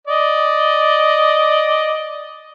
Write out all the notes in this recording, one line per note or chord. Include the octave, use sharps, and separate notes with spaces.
D5 D#5